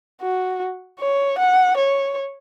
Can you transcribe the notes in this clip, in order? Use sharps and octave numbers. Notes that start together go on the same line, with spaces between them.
F#4
C#5
F#5
C#5